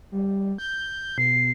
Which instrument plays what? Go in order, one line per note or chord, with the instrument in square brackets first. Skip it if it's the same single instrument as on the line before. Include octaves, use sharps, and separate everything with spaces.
[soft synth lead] G3
G6
[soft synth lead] B2 [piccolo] C7